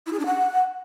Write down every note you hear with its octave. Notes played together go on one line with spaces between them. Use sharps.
E4
G#4
D4
F#5